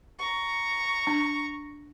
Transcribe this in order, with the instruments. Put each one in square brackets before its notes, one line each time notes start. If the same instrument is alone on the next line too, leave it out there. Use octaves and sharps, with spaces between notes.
[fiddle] A#5 C#6
[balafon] D4